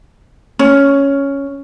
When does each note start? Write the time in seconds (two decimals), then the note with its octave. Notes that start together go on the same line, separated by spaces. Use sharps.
0.59 C#4